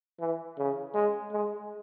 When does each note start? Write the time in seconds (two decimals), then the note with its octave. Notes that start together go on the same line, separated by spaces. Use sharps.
0.20 E3
0.58 C#3
0.95 G#3
1.32 G#3